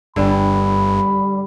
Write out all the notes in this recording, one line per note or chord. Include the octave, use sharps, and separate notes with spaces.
G1 G2 D3 G3 B5